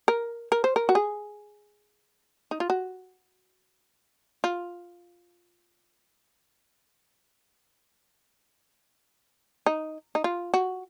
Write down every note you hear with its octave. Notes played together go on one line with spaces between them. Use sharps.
A#4
A#4
C5
A#4
F#4
G#4
D#4
F4
F#4
F4
D#4
D#4
F4
F#4